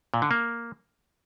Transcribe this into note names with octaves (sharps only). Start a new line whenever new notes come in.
A#2
D3
A#3